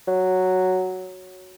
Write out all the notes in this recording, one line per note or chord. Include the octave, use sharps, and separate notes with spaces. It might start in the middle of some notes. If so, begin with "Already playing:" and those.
F#3